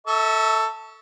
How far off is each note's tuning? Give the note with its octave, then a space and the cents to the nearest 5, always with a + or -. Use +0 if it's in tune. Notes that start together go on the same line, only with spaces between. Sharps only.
A4 +10 E5 -30 C#6 +20